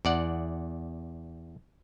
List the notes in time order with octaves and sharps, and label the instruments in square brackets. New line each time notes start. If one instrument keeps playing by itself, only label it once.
[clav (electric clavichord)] E2 D5 F#5